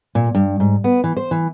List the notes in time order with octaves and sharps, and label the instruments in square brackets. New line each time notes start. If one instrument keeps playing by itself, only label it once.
[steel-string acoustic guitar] A#2
G2
G#2
B3
E3
C5
E3